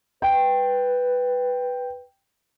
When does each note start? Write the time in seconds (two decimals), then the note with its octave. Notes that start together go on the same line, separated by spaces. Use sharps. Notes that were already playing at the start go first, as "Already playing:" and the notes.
0.22 B4 G5